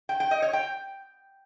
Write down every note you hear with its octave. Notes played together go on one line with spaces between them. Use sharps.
G5
G5
D#5
C#5
G5